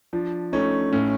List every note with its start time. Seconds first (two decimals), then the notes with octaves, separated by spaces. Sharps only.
0.13 F3 D4
0.53 A3 C#4 D#4
0.93 A2 C#4